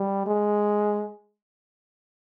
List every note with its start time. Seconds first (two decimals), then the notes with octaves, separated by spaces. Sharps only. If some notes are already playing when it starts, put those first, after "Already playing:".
Already playing: G3
0.27 G#3